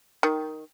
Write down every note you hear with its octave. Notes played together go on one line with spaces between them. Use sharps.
D#3